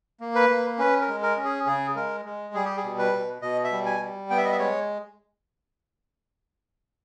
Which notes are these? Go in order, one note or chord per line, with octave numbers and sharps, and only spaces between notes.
A#3
B4
A#3
C#4 B4
A#4
G#3
A#4
C#4
G#4
C#3 G#4
G#3 A#4
G#3
G3 G#4
G4
G#4
B2
B4
B2
B2 D#5
E5
G3
G#5
G3
B3 G5
E5
D#5
E5
G#3 C#5